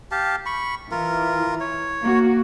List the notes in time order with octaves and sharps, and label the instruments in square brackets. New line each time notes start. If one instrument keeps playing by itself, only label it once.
[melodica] G4 F5 A5
B5 C#6
[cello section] E3 [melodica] F4 A#4
[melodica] C#5
[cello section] A#3 F#4